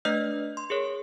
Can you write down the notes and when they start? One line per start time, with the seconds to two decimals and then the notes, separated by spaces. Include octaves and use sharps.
0.05 A3 D4 B4 D#5 F6 G6
0.57 C6
0.70 G#4 A#4 C#5